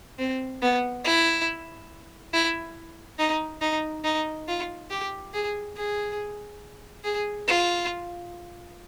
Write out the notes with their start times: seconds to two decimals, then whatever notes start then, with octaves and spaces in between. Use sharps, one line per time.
0.19 C4
0.62 B3
1.05 E4
2.33 E4
3.19 D#4
3.61 D#4
4.04 D#4
4.48 F4
4.90 G4
5.33 G#4
5.76 G#4
7.04 G#4
7.47 F4